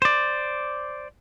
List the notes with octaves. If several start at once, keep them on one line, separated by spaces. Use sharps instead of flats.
C5 D5